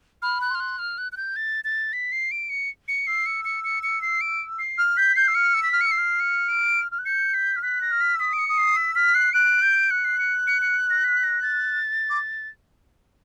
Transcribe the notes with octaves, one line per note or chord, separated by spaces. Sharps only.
B5 F6
F#6
C6 F6
F#6
F6
F#6
F#6
G6
A6
A6
B6
C7
D7
C#7
C#7
E6 C7
C#7
C#7
C#7
C#7
C7
D7
C7
F6
G6 B6
G6 C7
E6
F6 C#7
E6
B6
F6
E6 C#7
C7
F6
C#7
D7
F6
F#6
G6 C#7
B6
F6
F#6 B6
A#6
F6
B6
E6
D#6 B6
D7
C#7
D#6
C7
E6 B6
F6 B6
F#6 C7
F#6 D7
G6
F#6 C#7
C7
C#7
C#7
C#7
A#6
B6
A#6
A6
D6